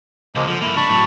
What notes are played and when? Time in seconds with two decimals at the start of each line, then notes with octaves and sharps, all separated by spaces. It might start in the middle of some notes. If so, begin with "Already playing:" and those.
0.35 C#2 F3 G#3 A#3
0.48 D3 F3
0.62 G2 A#3 E4
0.77 D4 A5 B5 C#6
0.90 A2 F#3